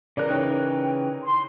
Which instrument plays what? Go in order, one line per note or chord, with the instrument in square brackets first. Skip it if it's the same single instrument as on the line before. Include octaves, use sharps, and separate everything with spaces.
[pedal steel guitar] C#3 E3 F#6 [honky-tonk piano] A#4 D5
[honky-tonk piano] D#4 A#4 C#5 [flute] G5
[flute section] C6